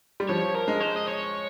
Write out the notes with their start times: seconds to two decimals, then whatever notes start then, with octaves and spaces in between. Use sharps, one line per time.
0.20 G3
0.29 F3 C#5
0.55 A#4
0.68 G#3
0.81 C5
0.96 D#5
1.08 C#5